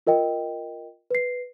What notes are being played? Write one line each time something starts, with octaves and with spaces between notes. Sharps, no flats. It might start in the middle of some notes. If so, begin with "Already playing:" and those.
F4 A#4 D#5 G5
B4 C7